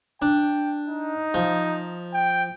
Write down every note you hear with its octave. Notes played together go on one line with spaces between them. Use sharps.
D4 G5
D#4
F3
G5